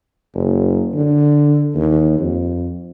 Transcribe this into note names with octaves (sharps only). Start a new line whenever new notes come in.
F#1
D3
D#2
F2